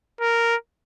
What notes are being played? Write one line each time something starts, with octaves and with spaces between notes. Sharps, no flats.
A#4